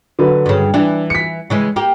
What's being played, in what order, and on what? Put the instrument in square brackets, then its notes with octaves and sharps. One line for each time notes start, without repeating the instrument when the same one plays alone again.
[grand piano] D3 F#3 B4
[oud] G2 C#3
[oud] E3 [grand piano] D4
[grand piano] B6 C#7
[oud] C#3 E3 G#3
A#3 G4